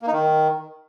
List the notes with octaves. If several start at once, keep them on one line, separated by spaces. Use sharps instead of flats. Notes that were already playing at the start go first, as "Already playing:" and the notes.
A#3
D#4
D#3